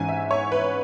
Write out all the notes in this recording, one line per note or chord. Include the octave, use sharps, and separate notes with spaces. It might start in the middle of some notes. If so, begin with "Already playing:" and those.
Already playing: G#2 E3 C#4 G#5
E5
C#5
B4